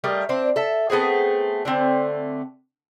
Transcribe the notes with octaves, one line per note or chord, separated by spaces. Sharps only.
G3 A3 A#3 D#5
C4 D4
A4 E5
A3 B3 C4 G#4
D3 A3 C4